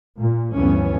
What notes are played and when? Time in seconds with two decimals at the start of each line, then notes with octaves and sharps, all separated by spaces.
0.17 A#2
0.54 D2 G2 E3 B3 C#4